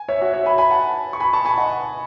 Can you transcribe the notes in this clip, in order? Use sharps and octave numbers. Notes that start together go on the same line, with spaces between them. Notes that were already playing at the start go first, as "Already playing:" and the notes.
Already playing: G#5
C#5 E5
F#4
C#5 E5
G#5 B5
G#5 B5
F#5 A5
C#6
G#5 B5
A5 C#6
G#5 B5
D#5 F#5